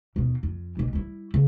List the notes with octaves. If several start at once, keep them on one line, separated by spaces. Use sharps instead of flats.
D#2 B2
F2
E1 B1
G3 E4
C#3